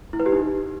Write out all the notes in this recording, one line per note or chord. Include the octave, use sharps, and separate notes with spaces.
E4
B4
G4
D#4